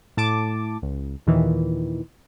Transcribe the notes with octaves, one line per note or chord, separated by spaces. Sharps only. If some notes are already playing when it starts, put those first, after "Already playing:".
A2 A5 D6
C#2
D#2 A#2 D#3 E3